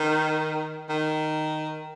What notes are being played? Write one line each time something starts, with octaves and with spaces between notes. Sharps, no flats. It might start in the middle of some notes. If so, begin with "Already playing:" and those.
Already playing: D#3
D#3